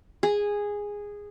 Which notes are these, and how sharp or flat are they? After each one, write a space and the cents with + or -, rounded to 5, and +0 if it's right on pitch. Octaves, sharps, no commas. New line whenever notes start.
G#4 -10